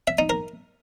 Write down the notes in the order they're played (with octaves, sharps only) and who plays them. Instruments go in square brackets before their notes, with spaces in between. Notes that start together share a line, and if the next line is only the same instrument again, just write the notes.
[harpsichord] E5
D#4
A#4